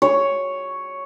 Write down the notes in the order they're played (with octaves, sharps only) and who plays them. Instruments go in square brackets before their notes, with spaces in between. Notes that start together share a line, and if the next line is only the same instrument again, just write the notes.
[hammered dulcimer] C#5